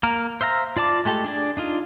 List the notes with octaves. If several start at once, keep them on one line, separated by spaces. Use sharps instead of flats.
A#3 A#4
C5 E5 F5 A#5
F4 D5 A5 D6
G#3 A3 G4 A4
D4 G#4 D5
D4 D#4 F4